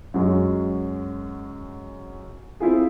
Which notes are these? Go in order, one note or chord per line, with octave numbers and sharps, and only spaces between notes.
F#2 F#3 G#3
C4 E4 F4 G#4